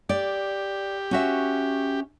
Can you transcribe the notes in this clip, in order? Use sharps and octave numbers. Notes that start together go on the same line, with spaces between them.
G4 D5
C#4 F#4 E5